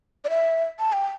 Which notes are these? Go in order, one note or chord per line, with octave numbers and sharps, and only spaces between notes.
D5
E5
A5
G5